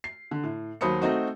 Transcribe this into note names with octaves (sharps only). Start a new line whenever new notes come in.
C7
D3
A2
D#2 F#3 C5 B5 D#6 C#7
A3 C4 D#4 F#4